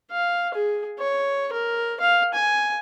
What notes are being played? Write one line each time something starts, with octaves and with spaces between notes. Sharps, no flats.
F5
G#4
C#5
A#4
F5
G#5